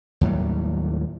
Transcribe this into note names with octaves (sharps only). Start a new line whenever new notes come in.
D#2 A2 F#3 G3